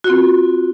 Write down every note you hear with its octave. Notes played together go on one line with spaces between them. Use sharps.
C4 F4 F#4